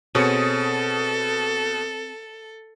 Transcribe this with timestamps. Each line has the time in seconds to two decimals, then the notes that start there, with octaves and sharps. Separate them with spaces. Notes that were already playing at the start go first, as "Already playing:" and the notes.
0.15 B2 C4 G#4 A4 C#5 D#6 C#7